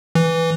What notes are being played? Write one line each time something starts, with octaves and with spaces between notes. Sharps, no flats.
E3